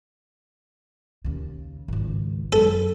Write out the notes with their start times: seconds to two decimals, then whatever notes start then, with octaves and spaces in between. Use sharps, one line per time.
1.24 D#2 C#3
1.88 G#1 C#2
2.53 F#2 A4